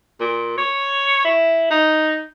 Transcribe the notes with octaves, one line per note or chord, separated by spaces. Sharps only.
A#2
C#5
E4
D#4